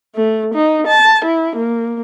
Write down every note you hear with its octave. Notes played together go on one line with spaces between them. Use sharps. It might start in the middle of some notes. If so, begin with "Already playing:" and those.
A3
D#4
A5
E4
A#3